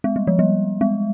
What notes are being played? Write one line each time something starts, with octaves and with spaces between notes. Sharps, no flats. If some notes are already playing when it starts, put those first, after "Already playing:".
G#3
G3
F3
G3
G#3